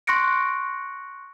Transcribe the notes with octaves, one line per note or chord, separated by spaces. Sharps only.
C6 C#6 F#6 A#6 C#7 D7